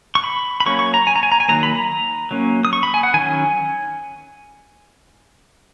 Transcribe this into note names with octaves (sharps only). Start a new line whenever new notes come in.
C#6
B5
B5
F#3 A#3 C#4 C#6
C#6
A#5
G#5
A#5
G#5
A#5
G#5
D#3 F#3 A#3 A#5
B5
A#5
F#3 A#3 C#4
D#6
C#6
B5
G#5
F#5
D#3 F#3 C#4 G#5